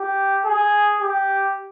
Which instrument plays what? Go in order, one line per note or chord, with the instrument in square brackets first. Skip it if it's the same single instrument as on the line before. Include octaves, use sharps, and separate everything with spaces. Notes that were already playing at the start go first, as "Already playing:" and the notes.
Already playing: [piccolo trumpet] G4
G#4
G4